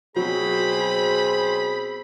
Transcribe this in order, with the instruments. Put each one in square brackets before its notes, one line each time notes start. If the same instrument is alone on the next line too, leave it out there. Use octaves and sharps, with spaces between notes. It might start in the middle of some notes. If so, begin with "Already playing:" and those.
[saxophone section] B2 C4 C5 [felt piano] F#3 [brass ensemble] G#4 [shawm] B5